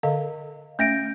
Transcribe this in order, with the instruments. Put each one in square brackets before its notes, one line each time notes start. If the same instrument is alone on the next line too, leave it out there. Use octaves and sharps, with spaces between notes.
[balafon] D3 A4 D#5 [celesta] F5
[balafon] A3 C#4 E5 [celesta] G6 A#6 D7